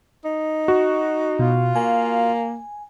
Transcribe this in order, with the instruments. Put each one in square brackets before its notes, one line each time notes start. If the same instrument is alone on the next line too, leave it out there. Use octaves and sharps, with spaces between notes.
[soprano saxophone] D#4
[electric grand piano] F#4
[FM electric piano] B2 [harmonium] F4
[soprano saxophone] A#3 [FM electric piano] G#5